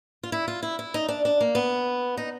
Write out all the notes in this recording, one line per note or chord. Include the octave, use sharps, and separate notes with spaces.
F4
E4
F4
E4
E4
D#4
D4
D4
A#3
B3
D#4